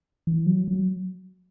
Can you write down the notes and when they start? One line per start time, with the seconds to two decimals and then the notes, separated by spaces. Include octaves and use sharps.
0.27 E3
0.46 F#3
0.68 F#3